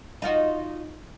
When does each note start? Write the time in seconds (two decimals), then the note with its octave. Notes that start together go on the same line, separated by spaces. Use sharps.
0.22 D#4 F4 F#4